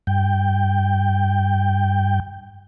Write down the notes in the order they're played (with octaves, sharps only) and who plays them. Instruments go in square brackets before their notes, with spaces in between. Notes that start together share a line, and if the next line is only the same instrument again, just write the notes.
[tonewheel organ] G2 G5